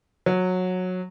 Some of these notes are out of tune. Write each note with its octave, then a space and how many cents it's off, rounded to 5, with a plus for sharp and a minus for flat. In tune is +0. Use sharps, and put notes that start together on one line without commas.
F#3 -15